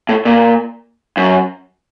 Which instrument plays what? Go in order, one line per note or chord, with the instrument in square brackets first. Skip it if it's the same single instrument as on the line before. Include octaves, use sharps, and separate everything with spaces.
[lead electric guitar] A2
A#2
F#2